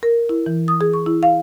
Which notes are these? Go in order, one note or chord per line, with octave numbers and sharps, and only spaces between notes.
A#4
E4
E3
D#6
G#4
C#6
E4
F5